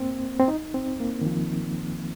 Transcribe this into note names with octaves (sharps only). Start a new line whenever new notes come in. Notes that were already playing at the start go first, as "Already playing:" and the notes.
Already playing: A#3 C4
C4
D#4
C4
A#3
D#3
F3